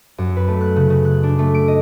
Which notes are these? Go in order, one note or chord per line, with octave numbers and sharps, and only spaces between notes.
F#2
B4
A3
F#6
C#3
C#3
F#6
D4
A3
D7
D#5